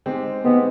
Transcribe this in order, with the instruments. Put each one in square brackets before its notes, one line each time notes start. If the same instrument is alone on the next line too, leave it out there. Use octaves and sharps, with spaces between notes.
[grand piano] G#3 C4 D#4 G4
[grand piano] G#3 C4 D#4 G4 [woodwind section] B3